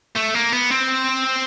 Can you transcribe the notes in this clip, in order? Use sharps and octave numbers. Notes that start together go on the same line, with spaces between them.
A3
A#3
B3
C4